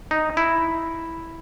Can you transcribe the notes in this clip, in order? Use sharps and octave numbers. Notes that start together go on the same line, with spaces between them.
D#4
E4